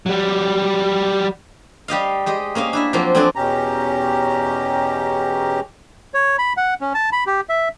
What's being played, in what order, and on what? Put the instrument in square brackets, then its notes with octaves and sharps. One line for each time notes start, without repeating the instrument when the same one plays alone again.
[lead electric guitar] F#3 G3
[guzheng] G3 G4 D#5 F5
G#3 G4 D#5
A#3 C#4 D#5 F5
D4 E4 E5
F3 F#3 A#3 C4
F2 C4 D4 A4 D5 G#5
[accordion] E2 B2 C#4 G4 A#5
[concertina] C#5
B5
F#5
C#4
A5
B5
G4
E5